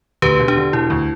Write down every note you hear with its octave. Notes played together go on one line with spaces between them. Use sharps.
D2 G4 B4
E1
D4 G4
D3
E1 E4
D2